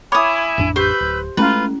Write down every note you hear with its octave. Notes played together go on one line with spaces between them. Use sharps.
E4 C#5 G#5 B5 D6 D#6
A1 F2 D4
G4 B4 C5 E6 G6
D1
G#3 A3 C#4 E4 F4 B4